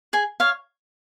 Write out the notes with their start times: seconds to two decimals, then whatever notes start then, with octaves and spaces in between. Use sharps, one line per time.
0.13 G#4 G#5
0.40 C#5 F5